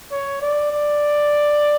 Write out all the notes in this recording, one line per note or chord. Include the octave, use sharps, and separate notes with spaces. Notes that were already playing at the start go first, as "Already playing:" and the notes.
C#5
D5
D5